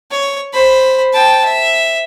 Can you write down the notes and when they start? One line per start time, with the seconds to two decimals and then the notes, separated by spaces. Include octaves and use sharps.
0.11 C#5
0.53 C5 B5
1.13 G5 A5
1.45 E5